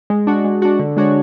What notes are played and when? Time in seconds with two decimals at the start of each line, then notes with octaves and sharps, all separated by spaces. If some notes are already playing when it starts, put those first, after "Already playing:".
0.10 G#3
0.27 D4 F#4
0.44 G#3
0.62 D4 F#4
0.79 D3
0.97 G#3 D4 F#4 C#5